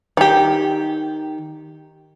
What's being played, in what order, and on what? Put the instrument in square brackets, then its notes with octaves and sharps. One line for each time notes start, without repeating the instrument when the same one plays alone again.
[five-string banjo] D#3 G4